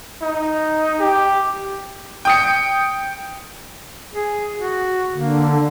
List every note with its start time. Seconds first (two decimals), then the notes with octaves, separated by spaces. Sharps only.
0.22 D#4
1.00 G4
2.25 G5 D#6 C#7
4.14 G#4
4.57 F#4
5.14 D3 A#3